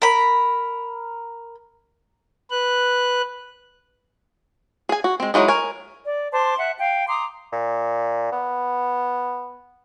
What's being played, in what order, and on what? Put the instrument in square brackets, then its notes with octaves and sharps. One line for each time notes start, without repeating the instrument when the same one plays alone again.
[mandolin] A#4 B5
[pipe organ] B4 F#6
[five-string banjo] G#4 G#5
F#4
G#3 C4
E3 F#3 G#3 D#4
A#4 C#5 G#5
[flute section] D5
C5 A5 C6 D6
E5 F#5 F#6
F5 G5
A#5 C6 D6 D#6
[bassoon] A#2
B3